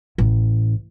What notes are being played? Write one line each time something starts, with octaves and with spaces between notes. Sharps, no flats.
A1